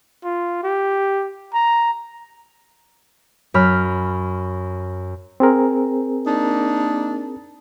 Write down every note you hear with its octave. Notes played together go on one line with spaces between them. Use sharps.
F4
G4
A#5
F#2 B5 F6
C4 G#4 A#4
A#3 D4 D#4